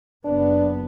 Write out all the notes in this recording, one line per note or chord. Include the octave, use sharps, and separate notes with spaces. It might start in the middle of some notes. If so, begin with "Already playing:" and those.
F#1 B3 D4